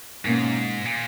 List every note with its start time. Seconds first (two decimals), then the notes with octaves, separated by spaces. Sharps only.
0.25 G#2 B2 A#3 C#4
0.85 A#2